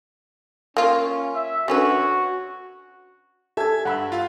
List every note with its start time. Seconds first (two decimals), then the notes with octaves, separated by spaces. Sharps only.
0.77 A#3 C#4 F4
1.35 E5
1.68 D3 C#4 F#4 B4
3.57 G4 A4 E5 G#5 G#6
3.85 G2 F#5 B5 E6
4.12 F4 F5